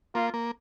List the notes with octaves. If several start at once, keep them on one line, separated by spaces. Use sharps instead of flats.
A#3 F4
A#3